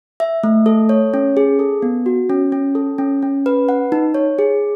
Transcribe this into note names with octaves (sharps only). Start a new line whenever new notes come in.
E5
A3
A4
C#5
C#4
G#4
A4
B3
F#4
C#4
C#4
A4
C#4
C#4
B4
F#5
D#4
C#5
G#4